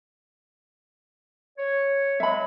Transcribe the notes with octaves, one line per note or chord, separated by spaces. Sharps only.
C#5
F#3 G#3 E5 B5